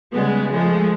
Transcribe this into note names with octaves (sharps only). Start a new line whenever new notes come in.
C#3 G3 G#3 B3
F3 G#3 A3